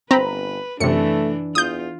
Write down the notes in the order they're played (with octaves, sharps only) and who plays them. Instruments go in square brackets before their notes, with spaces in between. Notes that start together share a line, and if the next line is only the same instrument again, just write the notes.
[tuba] G1 [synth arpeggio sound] C4 [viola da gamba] B4 [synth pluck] A#5 B5
[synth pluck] F#2 C3 [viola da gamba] E3 D4 [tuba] A3 [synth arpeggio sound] C#7
[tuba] E2 [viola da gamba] F4 [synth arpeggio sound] D#6 G6